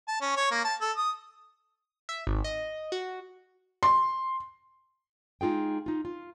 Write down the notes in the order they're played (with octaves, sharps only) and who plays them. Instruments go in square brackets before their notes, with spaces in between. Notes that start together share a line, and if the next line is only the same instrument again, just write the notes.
[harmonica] A5
C#4
C#5
A#3
A5
A4
D#6
[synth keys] E5
G#1
D#5
F#4
[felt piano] C6
[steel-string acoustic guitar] G#3 D#4 F4 G#4 G5
D#4 F4
F4